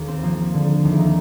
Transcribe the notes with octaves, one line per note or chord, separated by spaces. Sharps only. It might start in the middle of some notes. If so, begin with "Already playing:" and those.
Already playing: D#2
C4
F3 A#3
D3
D#2 D#4
E4
D#4